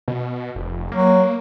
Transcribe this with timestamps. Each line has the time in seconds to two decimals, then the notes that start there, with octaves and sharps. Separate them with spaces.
0.08 B2
0.56 F1
0.92 F#3 A#3